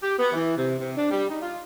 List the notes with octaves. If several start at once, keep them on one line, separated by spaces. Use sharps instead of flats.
G4
B3
E3
C3
C3
D4
G3
D#4
F4